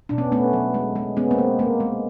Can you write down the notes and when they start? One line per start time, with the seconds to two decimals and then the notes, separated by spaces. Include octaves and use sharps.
0.09 B2 D4
0.18 B3 C#4
0.32 A3 B3 C#4
0.53 F#3
0.74 G#3
0.96 G#3
1.17 G#3 B3 C#4
1.31 A#3 C4
1.38 G#3
1.59 G#3 A#3
1.80 G#3